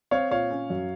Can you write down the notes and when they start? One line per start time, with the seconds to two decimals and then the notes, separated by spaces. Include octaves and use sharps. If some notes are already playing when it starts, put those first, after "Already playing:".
0.11 C4 C#5 F5
0.31 A#2 C#5 F5
0.51 C#4
0.70 F#2